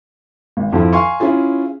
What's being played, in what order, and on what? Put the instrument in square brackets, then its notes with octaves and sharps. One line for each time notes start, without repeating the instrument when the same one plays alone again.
[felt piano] G#1
F2 F3 E4
F5 G#5 C6 C#6
C#4 E4 F4 G#4